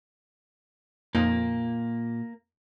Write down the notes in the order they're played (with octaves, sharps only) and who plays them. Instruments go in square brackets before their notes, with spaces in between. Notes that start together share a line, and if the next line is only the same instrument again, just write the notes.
[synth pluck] F2 D#4 [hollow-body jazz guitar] A#2 [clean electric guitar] A#3